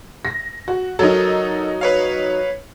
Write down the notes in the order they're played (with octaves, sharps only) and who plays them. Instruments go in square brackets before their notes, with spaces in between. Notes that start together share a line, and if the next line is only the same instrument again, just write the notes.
[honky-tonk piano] A#6
F#4
[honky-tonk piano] F#3 D#4 [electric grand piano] A4 A#4
[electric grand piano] B4 C#5 F5